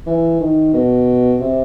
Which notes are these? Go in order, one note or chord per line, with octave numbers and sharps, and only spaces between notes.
E3
D#3
B2
C3